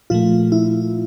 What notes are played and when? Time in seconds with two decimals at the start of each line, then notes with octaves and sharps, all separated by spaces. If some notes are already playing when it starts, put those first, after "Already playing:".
0.10 A#2 F3 A3 F4
0.52 E4